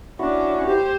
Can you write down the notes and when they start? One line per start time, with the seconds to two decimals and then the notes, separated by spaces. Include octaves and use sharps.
0.19 C#4 D4 E4 F#4
0.66 G4 C5